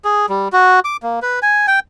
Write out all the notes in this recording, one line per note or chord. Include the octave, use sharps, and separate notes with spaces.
G#4
G3
F#4
D6
A#3
B4
G#5
G5